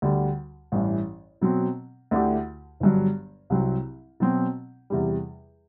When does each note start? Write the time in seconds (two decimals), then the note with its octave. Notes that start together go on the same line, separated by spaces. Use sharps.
0.02 D2 D3 G3
0.72 A1 G2 E3
1.41 B2 F#3 C4
2.11 D2 D3 A3 E4 G4
2.80 G1 G2 F#3
3.50 C2 C3 F#3 C4
4.20 B2 F#3 C4
4.90 E2 C3 G3